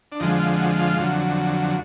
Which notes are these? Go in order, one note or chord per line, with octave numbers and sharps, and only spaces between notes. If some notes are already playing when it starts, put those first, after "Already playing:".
D4
F2 D3 F3 G#3 D#4
F4
F#4
F4
F2 D3 F#3